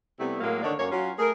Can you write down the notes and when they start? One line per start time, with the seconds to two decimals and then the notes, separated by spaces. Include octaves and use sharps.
0.19 C3 G3 A3 B3 E4
0.41 A2 F#3 G#3 A#3
0.63 D3 D#3 D4 C#5 D5
0.78 F#2 A#3 C#5
0.91 F#3 C#4 F4
1.19 A3 G#4 A#4